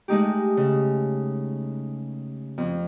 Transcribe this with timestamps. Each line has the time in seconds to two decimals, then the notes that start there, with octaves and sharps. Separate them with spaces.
0.08 G#3 A3 D#4 G4
0.57 C#3
2.58 F2 C4